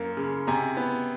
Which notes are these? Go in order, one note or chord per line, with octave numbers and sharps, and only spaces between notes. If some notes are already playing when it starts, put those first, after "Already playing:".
Already playing: F#2 A#3
C#3
C3 G#5 A#5
B3